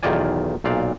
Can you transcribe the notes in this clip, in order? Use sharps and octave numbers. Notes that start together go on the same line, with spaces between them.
B1 E2 D#3 F4 D5 G#5
B1 A#2 D5 F5